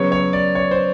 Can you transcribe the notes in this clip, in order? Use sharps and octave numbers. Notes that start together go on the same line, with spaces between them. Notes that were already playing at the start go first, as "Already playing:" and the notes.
Already playing: C#3 F#3 B3 C#5
C#5
D5
C#5
C5